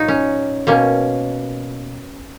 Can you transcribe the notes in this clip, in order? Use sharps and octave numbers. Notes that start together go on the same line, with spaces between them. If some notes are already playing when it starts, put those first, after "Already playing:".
Already playing: A#2 F#3 D#4 C#5
C#4
B2 A#3 C#4